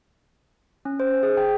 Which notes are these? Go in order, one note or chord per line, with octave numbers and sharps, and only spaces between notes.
C#4
C5
G#4
G5